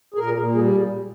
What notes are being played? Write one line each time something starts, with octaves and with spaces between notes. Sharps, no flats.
G#4
A#2 A#4
A#2
G3 G#4